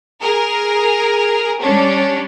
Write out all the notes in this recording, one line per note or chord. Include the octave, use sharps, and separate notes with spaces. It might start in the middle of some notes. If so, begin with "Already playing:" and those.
G#4 A#4
G3 C#4 D4